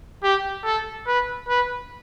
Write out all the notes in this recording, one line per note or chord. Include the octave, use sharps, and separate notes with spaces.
G4
A4
B4
B4